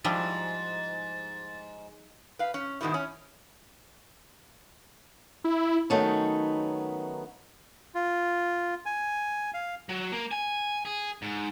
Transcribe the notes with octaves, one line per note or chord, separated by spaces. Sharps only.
G#2 F3 G3 E4 A6
B4 F5
C#4
G#2 B2 D#3 G3 G#3 E4
C#4
E4
D#3 F#3 A3 B3 C#4 D#4
F4
G#5
F5
F#3
A#3
G#5
G#4
G#2